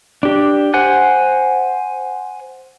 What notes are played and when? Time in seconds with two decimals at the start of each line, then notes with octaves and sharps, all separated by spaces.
0.23 D4 G4
0.74 C5 F#5 G#5 F#6